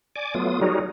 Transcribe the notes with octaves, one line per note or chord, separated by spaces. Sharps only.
D5 G#5 D6
F#3 A3 B3 F4 D#6
F#3 G3 D#4 F#4 G#4 A#4